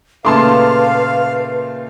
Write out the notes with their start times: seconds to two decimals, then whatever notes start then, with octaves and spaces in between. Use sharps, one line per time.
0.25 A#2 C#3 A3 B4 F5 A5 C6 D6